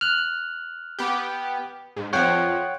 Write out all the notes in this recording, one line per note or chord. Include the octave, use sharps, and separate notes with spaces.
F6 F#6
B3 G4
G#2
F2 F3 C#5 F#5 G5